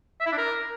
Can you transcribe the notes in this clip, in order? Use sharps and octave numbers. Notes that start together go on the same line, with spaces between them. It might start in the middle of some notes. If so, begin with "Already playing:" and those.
E5
E4
D4
A#4